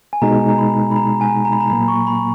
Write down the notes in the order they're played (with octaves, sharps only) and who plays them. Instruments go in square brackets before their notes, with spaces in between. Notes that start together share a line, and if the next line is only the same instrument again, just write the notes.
[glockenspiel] G#5
[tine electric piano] B2 G#3 D#4 [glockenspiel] A#5
[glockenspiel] A#5
B5
B5
A#5
G#5
A#5
B5
A#5
[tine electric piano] A#2 F#3 A#3 [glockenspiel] B5
[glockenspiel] C#6
B5